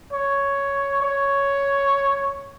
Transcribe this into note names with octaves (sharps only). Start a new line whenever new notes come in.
C#5
C#5